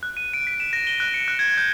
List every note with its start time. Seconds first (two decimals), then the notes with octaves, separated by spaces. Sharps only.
0.03 F#6
0.17 D#7
0.34 D7
0.47 B6
0.60 E7
0.73 A#6
0.87 G7
1.00 F#6
1.14 C#7
1.28 F#6
1.39 G#6
1.57 G6